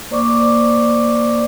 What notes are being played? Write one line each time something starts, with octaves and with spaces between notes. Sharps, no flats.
A#3 C5 D5 C#6 D6